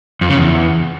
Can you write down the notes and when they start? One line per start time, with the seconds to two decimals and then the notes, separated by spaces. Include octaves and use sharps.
0.21 F2
0.29 C#3
0.38 E2